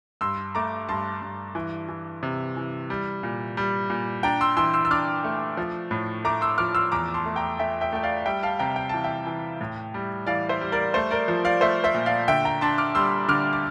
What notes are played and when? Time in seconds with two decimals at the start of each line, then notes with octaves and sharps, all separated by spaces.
0.21 G2 C6 E6
0.55 A3 A#5 D6
0.89 G2 A5 C6
1.22 G2
1.55 E3
1.88 E3
2.23 C3
2.57 E3
2.90 G3
3.23 A#2
3.57 G3
3.90 A#2
4.23 D4 G5 A#5
4.41 C6 E6
4.57 E3 C6 E6
4.73 C6 E6
4.85 E6
4.91 D4 D6 F6
5.24 A3
5.57 F3
5.91 A2
6.25 A3 A#5 D6
6.41 C6 E6
6.58 F3 D6 F6
6.75 C6 E6
6.92 E2 A#5 D6
7.14 A5 C6
7.26 A3
7.36 G5 A#5
7.59 A3 E5 G5
7.81 E5 G5
7.92 A3 G5
8.03 D5 F5
8.26 G3 E5 G5
8.43 F5 A5
8.59 C3 G5 A#5
8.76 G5
8.89 E3 A5
9.04 E5 G5
9.26 E3
9.61 A2
9.94 G3
10.27 E3 D5 F5
10.49 C5 E5
10.61 G3
10.72 A#4 D5
10.94 A3 A4 C5
11.11 A#4 D5
11.28 F3
11.45 D5 F5
11.61 A3 C5 E5
11.84 C5 E5
11.94 A#2
12.06 D5 F5
12.28 D3 E5 G5
12.45 G5 A#5
12.61 D4 A5 C6
12.78 D6 F6
12.95 G3 C6 E6
13.28 D3 D6 F6
13.53 D6